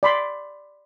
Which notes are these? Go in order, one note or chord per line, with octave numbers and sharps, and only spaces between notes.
D5 B5 C6